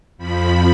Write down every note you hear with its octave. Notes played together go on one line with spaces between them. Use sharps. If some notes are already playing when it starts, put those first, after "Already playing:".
F2 F3 B5